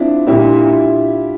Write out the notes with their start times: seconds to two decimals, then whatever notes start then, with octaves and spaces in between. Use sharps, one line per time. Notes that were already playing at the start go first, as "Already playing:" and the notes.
Already playing: C4 D4 E4 F4
0.27 A#2 E4 G4
0.37 D4 F4
0.68 F4